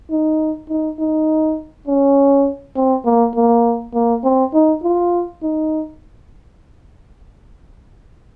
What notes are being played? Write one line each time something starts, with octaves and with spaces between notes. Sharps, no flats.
D#4
D#4
D#4
C#4
C4
A#3
A#3
A#3
C4
D#4
F4
D#4